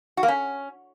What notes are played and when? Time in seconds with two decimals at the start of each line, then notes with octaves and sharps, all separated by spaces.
0.17 F#4
0.23 A#3
0.28 C#4